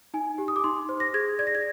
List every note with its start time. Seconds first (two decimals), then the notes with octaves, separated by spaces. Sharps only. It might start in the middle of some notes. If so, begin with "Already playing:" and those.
0.14 D#4 G#5
0.38 G4
0.48 D#6
0.56 D6
0.64 D#4 C6
0.89 C5
1.00 A#6
1.14 G#4 G#6
1.39 D5 G#6
1.47 A#6
1.55 G#6